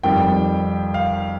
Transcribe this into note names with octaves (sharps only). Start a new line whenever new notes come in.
F2 D#3 G3 G5
F5